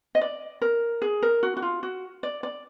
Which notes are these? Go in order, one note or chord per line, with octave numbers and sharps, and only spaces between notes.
D#5
D5
A#4
G#4
A#4
F#4
F#4
F4
F#4
D5
D5